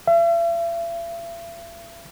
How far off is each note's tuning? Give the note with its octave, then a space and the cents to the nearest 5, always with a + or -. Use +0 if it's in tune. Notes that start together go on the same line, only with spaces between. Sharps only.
E5 +45